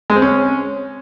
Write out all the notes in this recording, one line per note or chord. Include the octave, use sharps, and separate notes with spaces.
G#3
C4
C#4